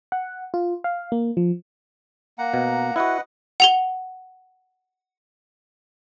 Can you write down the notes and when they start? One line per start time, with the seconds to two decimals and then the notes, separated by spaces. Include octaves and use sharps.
0.12 F#5
0.54 F4
0.84 F5
1.12 A#3
1.37 F3
2.38 A#3 F#5 A#5
2.54 B2
2.96 E4 F#4 B4 D#5 F#5
3.60 F#5 F7 G7